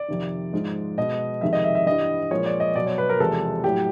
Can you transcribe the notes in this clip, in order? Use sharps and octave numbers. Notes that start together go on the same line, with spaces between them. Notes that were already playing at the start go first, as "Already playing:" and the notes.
Already playing: D5
F2 C3 D#3
G#2 F3 G#3
B2 G#3 D#5
F2 C3 D#3 G#3 E5
D#5
E5
E5
G2 E3 G3 D#5
A#2 F3 G#3 C#5
D5
D#5
B2 F#3 D5
C#5
B4
A#4
E2 C3 F3 G#3 A4
A2 F#3 G4